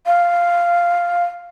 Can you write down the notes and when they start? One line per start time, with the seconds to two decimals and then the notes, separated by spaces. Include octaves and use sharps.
0.06 F5